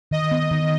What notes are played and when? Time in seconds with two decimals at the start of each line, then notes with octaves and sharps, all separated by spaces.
0.11 D#3 D#5
0.31 B3
0.51 D#3